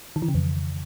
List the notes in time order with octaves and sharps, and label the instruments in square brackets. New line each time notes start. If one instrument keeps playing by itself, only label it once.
[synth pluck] D#3
E3
C#3
F2